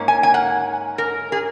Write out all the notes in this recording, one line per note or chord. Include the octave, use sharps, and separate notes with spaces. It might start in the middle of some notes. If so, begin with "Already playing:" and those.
Already playing: G#2 A#3 C#4
G#5
G#5
F#5
A#4
G#4